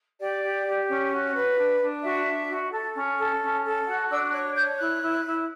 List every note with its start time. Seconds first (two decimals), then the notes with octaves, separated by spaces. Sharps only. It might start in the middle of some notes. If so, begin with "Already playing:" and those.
0.19 G4 D5
0.41 G4
0.65 G4
0.88 C#4
1.11 F#4
1.34 B4
1.56 D4
1.80 D4
2.02 F#4 E5
2.25 D4
2.48 F#4
2.71 A4
2.95 C#4
3.17 A4
3.41 C#4
3.64 A4
3.86 F#4 F#5
4.09 D4 E6
4.32 C#5 F#6
4.55 C#5 G6
4.78 E4 F#6
5.01 E4
5.24 E4